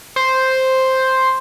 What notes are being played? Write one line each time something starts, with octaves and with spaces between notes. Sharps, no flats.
C5